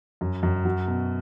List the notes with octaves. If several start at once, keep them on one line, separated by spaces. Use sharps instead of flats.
F#2
F#2
F#3
B2